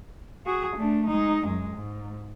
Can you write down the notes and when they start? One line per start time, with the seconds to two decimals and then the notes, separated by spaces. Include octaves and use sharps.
0.46 F#4 G#4
0.77 A3 D4
1.07 G#3 D#4
1.45 F#2 G#3
1.76 G#2